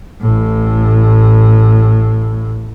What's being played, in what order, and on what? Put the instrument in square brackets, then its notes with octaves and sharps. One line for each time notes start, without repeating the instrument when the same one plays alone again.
[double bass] A1 A2